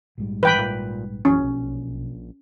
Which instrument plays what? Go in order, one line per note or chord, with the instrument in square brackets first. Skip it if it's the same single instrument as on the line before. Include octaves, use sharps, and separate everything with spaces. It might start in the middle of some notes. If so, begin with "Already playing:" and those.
[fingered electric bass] A#1 G#2 G3
[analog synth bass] E3 [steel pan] B4 G5 B5
[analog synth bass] A#2
[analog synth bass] A#1 [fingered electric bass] F#2 E3 [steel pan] C#4
[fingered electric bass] B1